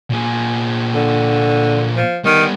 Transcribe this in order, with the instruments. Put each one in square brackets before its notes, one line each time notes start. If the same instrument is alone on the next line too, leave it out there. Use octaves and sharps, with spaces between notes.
[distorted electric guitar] A#2 G#4
[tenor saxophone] D3
F3
[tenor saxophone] D#3 [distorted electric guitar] G3 B3